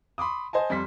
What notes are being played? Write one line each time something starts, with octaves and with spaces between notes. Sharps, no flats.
B5 C6 D6 D#6
C5 D#5 G#5 A5
F2 G3 C6 B6